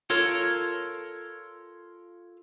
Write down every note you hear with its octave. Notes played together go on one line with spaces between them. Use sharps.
F4 A4 A#4 C#5